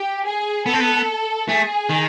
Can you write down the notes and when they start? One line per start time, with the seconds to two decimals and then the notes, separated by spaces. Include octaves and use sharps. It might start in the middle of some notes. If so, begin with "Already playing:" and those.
Already playing: G4
0.25 G#4
0.66 B3 A4
0.73 C4
0.80 B3
1.49 A3 G#4
1.90 D#3